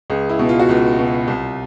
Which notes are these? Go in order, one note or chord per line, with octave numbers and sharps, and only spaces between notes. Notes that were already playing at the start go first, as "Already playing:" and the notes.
C#2 G#4
E4
B2
F4
F#4
C#2 F4
B2
C2